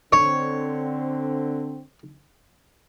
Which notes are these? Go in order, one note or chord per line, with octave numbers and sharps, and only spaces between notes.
D3 C4 C#5